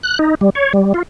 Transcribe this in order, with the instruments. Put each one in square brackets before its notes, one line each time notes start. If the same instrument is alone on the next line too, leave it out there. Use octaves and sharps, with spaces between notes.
[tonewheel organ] F#6
D#4
G3
C#5
G3
F4